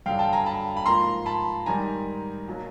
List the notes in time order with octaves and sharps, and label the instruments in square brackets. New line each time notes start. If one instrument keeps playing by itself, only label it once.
[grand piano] G2 D3 F#3 F5 G5
G5 A5
G#5 A#5
A5 B5
B5
G#2 F3 A#3 A#5 C6
A5 B5
G#2 D#3 G3 G#5 A#5
B2 F#3 A#3